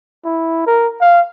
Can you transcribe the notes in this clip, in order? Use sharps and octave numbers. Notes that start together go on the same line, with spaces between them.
E4
A#4
F5